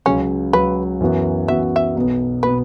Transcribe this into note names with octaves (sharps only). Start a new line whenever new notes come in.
C#2 C#3 F#3 C#4
C#2 C#3 F#3 B4
F#2 E3 B3 F#4
F#2 E3 B3 F#4 E5
E5
B1 B2 B3
B2 B3 B4